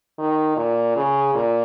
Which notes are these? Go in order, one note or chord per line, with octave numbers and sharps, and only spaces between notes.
D#3
A#2
C#3
A#2